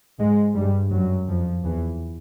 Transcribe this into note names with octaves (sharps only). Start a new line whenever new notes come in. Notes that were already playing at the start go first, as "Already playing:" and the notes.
G#2 G#3
G2 G3
F#2 F#3
F2 F3
E2 E3